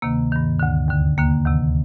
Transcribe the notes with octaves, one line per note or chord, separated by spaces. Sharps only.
D2 C3 D#3 A#3
G2 D#3
D2 D3
D#2 D3
D#2 D3 A#3
D2 C3 D#3